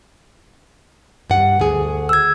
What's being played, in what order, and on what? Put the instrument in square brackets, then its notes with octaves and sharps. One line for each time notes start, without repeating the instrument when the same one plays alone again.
[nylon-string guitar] G2 F#5
D2 G#4
[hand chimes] E6 G#6